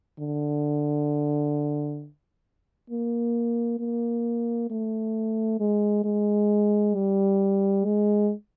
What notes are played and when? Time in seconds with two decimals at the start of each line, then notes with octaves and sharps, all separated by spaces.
0.19 D3
2.90 A#3
3.80 A#3
4.70 A3
5.60 G#3
6.04 G#3
6.95 G3
7.85 G#3